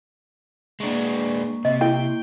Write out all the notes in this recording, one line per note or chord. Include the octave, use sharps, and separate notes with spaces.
G#3 A#3 D4 C#6
C3 D#5
E4 G5